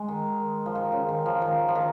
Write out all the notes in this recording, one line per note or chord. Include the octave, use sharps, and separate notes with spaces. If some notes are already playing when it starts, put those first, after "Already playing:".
Already playing: G#3
D#3
F3
D#3
C#3
D#3
F3
D#3
F3
D#3